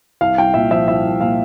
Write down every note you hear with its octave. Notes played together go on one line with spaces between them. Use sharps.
C2 F5
C2 G5
A#2 E5
F3 E5
C2 E5
C2
A#2 F5